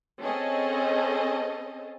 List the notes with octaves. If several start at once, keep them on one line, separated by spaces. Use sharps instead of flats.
C4 C#4 G#4 A4 D#5 A5